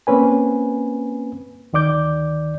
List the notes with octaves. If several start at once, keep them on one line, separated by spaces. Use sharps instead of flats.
A#3 C4 C#4 B4 G#5
D2 D#3 D5 D6 G6